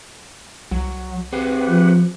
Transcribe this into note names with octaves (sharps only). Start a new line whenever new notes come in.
C2 F#3
C4 G4 G#4 B4 C5 F#5
F3